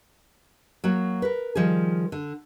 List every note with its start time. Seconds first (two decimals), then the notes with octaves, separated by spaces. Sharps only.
0.84 F#3 A#3 F#4
1.22 A#4 B4
1.55 D#3 F3 G3 G#4
2.12 D3